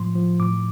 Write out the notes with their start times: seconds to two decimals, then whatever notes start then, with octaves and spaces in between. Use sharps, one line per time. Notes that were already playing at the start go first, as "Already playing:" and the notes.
Already playing: A2 F3 C6
0.15 F3
0.40 A2 D6